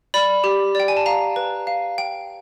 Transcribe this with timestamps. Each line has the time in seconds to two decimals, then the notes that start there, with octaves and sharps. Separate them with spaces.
0.14 D5 B5
0.44 G4
0.75 D5 G5
0.88 G#5
0.97 A5
1.06 F5 A#5
1.36 B4
1.67 F5
1.98 G5